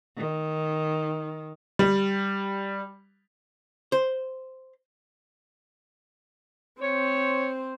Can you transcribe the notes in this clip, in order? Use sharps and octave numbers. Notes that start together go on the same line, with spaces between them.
D#3
G3
C5
C4 C5 C#5